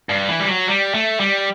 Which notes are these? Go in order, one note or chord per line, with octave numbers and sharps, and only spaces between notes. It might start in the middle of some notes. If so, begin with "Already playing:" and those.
G2
E3
G3
F#3
G3
A3
G3